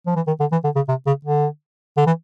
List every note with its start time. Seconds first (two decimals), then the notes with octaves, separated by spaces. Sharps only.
0.07 F3
0.16 E3
0.27 D#3
0.40 D3
0.52 E3
0.64 D3
0.76 C#3
0.88 C3
1.07 C#3
1.25 D3
1.97 D3
2.07 E3